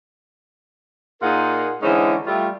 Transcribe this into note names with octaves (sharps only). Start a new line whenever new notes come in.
A#2 D#4 F4 G#4 A#4 F#5
D3 E3 G#3 C#4 D#4 C5
G3 A3 F4